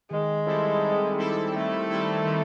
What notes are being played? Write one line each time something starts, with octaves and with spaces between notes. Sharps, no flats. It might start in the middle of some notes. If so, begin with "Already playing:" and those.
D#3 G#3
G3 C4 E4 A4
D#3
G3 C4 E4 A4
D#3 A3
G3 C4 E4 A4
D#3